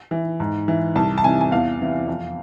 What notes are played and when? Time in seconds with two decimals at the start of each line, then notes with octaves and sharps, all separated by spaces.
0.11 E3
0.40 G#2
0.68 E3
0.95 C2 A5
1.18 A5
1.24 C3 E3 G#5
1.41 G#5
1.51 E2 F5
1.80 C3 E3
2.07 F2